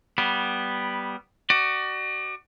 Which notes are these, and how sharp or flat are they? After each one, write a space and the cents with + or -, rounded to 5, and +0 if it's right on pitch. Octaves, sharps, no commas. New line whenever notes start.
G3 -10 B3 -5
F#4 +30 D5 +35